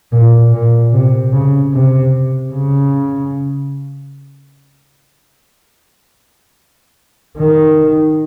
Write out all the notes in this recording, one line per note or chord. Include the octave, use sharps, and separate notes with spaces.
A#2
A#2
C3
C#3
C3
C#3
D#3